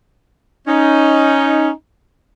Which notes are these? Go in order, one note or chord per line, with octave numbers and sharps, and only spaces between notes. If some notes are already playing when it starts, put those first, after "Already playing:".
C#4 D#4